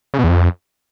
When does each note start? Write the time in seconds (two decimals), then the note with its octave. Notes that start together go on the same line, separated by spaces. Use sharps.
0.14 C#3
0.19 B2
0.24 E2
0.29 F2